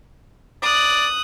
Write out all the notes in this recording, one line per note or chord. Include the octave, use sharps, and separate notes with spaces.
D5 D#6 F#6